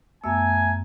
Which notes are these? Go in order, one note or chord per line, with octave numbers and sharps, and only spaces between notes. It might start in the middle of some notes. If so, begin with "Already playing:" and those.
F#2 A3 B3 E5 G#5 A#5 E6